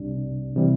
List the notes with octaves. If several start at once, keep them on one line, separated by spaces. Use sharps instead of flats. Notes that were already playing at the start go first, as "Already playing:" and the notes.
Already playing: C2 C3 G3 D4
C3 E3 G3